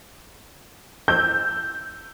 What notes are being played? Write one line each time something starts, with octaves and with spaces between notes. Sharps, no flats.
E6 G6